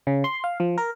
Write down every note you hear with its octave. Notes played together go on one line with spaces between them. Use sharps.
C#3
C6
F5
F3
A#4